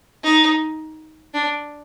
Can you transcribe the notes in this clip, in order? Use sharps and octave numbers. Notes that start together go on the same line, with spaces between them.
D#4
D4